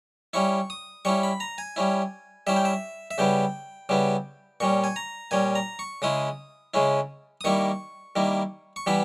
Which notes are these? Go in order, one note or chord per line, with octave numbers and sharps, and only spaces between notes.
G3 C#4 E4 C#6
D#6
G3 C#4 E4 C#6
B5
A#5
G#5
G3 C#4 E4
G3 C#4 E4 E5
G5
E5
E5
C#3 G3 B3 E4 G5
C#3 G3 B3 E4
A#2 G3 C#4 C#6
G#5
A#5
A#2 G3 C#4 G#5
A#5
C#6
C#3 G#3 C#4 E4 D#6
C#3 G#3 C#4 E4
D#6
D#3 G3 A#3 E4 C#6
D#3 G3 A#3 E4
C#6
E3 G3 B3 E4 B5